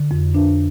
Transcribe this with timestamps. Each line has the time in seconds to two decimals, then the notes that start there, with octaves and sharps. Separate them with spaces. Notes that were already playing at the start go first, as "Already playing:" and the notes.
Already playing: D3
0.11 F2
0.34 D4